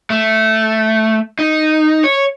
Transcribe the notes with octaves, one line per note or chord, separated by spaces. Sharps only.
A3
D#4
C#5